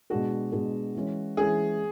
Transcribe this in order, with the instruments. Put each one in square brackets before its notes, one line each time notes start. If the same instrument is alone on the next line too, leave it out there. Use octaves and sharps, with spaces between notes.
[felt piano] B2 G#3 D4 G#4 [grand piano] F#4
[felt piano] B2 G#3 D4 G#4
E3 G#3 C#4
[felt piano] E3 G#3 C#4 [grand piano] G#4